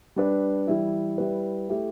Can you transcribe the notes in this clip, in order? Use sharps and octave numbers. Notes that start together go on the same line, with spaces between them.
G3 D4 B4
E3 G3 E4
G3 E4 B4
A3 E4 G4